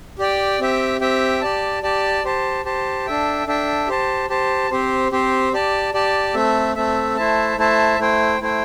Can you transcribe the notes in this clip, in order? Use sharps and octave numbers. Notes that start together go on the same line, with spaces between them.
G4 D5 G5
C4 G4 E5 G5
C4 G4 E5 G5
G4 D5 A5
G4 D5 A5
G4 C5 A5
G4 C5 A5
D4 A4 E5 G5
D4 A4 E5 G5
G4 C5 A5
G4 C5 A5
C4 G4 C5
C4 G4 C5
G4 D5 A5
G4 D5 A5
A3 C4 A4 E5
A3 C4 A4 E5
A3 E4 C5 E5 A5
A3 E4 C5 E5 A5
A3 E4 C5 G5
A3 E4 C5 G5